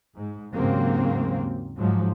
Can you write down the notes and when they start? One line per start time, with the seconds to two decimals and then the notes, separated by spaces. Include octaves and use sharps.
0.16 G#2
0.54 D#2 G#2 C#3 F#3 A#3 C4
1.78 G#2 F3 F#3